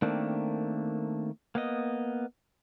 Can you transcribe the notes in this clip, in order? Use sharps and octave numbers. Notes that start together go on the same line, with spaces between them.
D#3 A3 A#3 C4 D4
A#3 B3 D#5